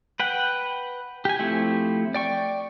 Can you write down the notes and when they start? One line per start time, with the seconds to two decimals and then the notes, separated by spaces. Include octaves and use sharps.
0.20 B4 F#5 G5
1.25 G4 G#5
1.39 F3 A3 C4 E4 G4
2.14 D5 G5 C#6